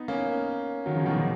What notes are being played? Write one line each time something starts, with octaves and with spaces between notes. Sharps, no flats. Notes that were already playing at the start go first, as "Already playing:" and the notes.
Already playing: B3 D#4
A#3 C#4
D#3 F#3
C#3 F3
B2 D#3
A#2 C#3